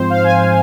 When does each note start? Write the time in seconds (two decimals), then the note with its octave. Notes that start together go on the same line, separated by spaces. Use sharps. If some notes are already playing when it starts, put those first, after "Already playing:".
Already playing: G#2 F3 C4 C5
0.10 F5
0.24 G#5